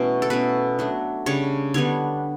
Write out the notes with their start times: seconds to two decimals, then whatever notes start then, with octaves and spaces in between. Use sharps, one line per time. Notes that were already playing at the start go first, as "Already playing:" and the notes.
Already playing: B2 E3 A3 C#4
0.22 A4
0.30 B2 A3 C#4 B4
0.79 F#3 A3 D4
1.26 C#3 G3 D4 C#5
1.74 D3 G3 B3 D4 C#5